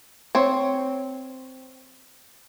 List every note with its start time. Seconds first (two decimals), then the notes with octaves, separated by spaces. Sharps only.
0.35 C4 C#5